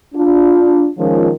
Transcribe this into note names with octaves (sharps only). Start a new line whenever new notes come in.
D4 F4
D#3 F3 G#3 C#4 F4 A#4